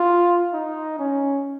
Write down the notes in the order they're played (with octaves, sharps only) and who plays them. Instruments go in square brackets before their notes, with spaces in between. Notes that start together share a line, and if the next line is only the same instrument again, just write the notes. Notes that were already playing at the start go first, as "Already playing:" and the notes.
Already playing: [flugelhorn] F4
D#4
C#4